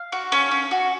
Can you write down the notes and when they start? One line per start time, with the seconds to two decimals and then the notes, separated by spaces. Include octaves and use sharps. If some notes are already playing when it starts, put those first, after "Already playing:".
Already playing: F5
0.12 F#4
0.32 C#4
0.51 C#4
0.71 F#4